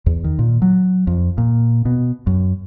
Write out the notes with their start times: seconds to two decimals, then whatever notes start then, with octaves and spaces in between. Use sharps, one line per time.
0.06 E2
0.24 D#3
0.39 A#2
0.62 F#3
1.07 F2
1.38 A#2
1.85 B2
2.27 F#2